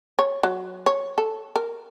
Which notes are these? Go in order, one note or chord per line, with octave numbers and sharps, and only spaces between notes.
C#5
F#3
C#5
A4
A#4